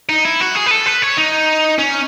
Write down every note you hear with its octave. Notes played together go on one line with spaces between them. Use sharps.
D#4
E4
F#4
G#4
B4
A4
B4
C#5
D#4
C#4